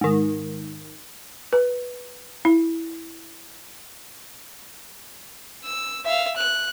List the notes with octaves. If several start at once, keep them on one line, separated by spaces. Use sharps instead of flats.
G#2 D#3
B4
E4
E6
E5 F5
F#6